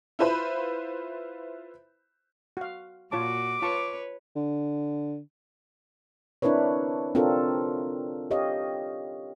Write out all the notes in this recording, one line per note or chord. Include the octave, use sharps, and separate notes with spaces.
E4 F4 B4 C5 B5
F#4 F5
A#2 F4 F#4 C#5 A5 D6
F4 B4 C#5 A5 C#6
D3
C4 D4 E4 A#4 B4 C#5
C4 D4 F4 A4 A#4
G4 C#5 D#5 F5